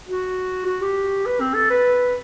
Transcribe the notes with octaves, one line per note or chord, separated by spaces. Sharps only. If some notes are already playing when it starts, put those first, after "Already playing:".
F#4
F#4
G4
B4
C4
A4
B4